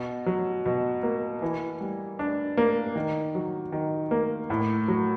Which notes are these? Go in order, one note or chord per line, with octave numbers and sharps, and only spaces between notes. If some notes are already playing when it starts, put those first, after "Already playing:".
Already playing: B2
F#3
B2
A#3
E3
G3
D4
A#3
D#3
F#3
D#3
A#3
A2
F#3